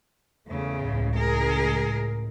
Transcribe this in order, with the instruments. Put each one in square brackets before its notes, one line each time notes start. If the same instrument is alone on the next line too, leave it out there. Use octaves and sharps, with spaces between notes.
[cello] E2 C#3 [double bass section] A3
[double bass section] C#2 A2
[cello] G#4 A#4